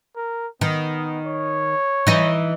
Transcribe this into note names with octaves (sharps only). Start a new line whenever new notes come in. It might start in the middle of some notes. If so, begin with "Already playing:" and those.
A#4
D#3 B3
C#5
E3 D#4